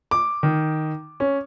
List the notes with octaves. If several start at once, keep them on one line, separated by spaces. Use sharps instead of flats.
D6
D#3
C#4